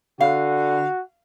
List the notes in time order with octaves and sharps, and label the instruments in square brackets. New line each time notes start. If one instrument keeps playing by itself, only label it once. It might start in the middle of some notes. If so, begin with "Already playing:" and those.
[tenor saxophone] D3 [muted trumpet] F#4 [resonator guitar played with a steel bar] F5